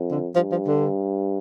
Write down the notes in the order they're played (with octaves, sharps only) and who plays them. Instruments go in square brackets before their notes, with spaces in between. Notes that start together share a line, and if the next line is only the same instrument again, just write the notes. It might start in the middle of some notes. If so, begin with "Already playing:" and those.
Already playing: [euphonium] F2
[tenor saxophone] D3
[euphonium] G2 [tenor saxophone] F3
[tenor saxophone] F3
D3